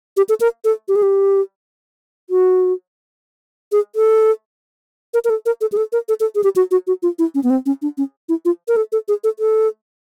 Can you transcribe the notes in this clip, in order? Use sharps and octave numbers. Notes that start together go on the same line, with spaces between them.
G4
A4
A#4
A4
G4
G#4
G4
F#4
G#4
A4
A#4
A#4
A4
A#4
A4
G#4
A4
A#4
A4
A4
G#4
G4
F#4
F#4
F#4
F4
E4
C#4
B3
C4
C#4
D4
C#4
E4
F4
A#4
A4
A4
G#4
A4
A4